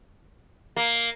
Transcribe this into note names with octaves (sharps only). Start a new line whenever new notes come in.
A#3